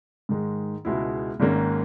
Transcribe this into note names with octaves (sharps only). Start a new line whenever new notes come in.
G#2 D#3 G#3
C#2 B2 G#3 B3 E4
G#1 G#2 D#3 A#3 C#4